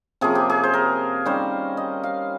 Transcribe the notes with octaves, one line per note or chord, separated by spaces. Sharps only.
C3 F3 A#3 C#4 G#4
G4
G#4
C5
A#4
D#3 G3 C#4 C5
D#5
F5